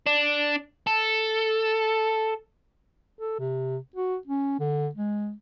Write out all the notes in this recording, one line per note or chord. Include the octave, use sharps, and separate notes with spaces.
D4
A4
A4
C3
F#4
C#4
D3
G#3